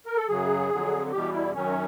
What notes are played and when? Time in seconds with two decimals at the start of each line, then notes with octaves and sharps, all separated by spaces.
0.06 A#4
0.17 A4
0.28 F#2 C#3 F#3 G#4
0.70 F2 D3 F#3
1.11 E2 B2 G3 G4
1.33 E4
1.53 F#2 D#3 F#3 C#4